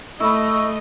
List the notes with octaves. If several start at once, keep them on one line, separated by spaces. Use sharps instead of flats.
A3 E4 D#5 C#6 E6